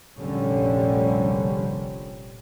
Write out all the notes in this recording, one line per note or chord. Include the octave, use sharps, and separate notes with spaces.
F1 A#1 D3 F3 G3 C#4